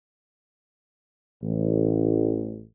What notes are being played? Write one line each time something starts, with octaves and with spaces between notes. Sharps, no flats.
A1